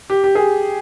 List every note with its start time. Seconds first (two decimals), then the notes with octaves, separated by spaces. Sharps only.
0.10 G4
0.24 G4
0.35 G#4